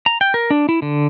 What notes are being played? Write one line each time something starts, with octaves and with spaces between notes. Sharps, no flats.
A#5
G5
A#4
D4
E4
D3